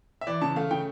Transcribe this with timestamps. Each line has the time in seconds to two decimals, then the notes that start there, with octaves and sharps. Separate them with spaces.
0.21 E5
0.27 E3 D5
0.41 C#3 A5
0.56 A3 F5
0.71 C#3 G5